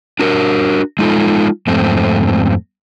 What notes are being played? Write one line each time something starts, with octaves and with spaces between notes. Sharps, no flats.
D4 F#4 A#4
G#3 D#4 F4 A4
F2 G#2 A3 C4